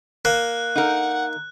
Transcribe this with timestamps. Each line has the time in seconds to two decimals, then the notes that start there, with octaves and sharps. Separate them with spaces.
0.25 A#3 F#6
0.76 D#4 A#4 F#5